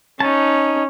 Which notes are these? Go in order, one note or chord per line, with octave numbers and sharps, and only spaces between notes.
C#4 D#4 A5